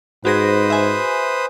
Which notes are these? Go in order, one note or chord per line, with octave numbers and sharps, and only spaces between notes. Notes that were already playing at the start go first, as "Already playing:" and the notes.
G#2 F#4 G#4 B4 C5 D#6 A#6
E5 G#5